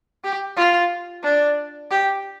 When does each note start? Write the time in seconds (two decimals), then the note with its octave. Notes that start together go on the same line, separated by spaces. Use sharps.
0.24 G4
0.57 F4
1.23 D4
1.91 G4